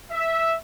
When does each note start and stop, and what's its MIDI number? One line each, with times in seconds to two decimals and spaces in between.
0.12 0.55 76